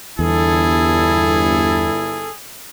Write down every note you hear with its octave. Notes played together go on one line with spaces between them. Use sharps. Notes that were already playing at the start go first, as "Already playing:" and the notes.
G1 E2 G2 E4 G#4 A4